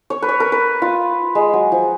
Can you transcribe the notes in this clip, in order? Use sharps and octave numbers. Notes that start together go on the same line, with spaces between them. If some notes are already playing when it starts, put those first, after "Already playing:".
C#5
B4
C#5
A#4
B4
F4
G#3
F#3
F3